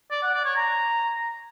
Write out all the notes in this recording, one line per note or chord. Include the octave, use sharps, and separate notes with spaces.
D5
F#5
D5
C#5
A#5